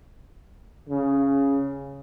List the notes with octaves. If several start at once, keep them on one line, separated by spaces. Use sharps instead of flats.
C#3